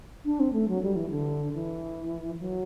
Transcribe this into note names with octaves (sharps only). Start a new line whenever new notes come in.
D4
C4
A3
F#3
G3
E3
D3
E3
F#3